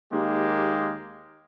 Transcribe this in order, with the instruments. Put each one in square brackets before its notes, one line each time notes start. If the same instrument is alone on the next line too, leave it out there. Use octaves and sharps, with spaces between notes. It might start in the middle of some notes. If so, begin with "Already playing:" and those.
[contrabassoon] D#2 [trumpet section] G#3 A#3 G4